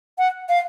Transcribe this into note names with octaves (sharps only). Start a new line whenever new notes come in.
F#5
F5